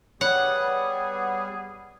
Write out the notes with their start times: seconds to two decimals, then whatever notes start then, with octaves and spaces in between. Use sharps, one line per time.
0.21 G3 B3 G#4 C#5 F#5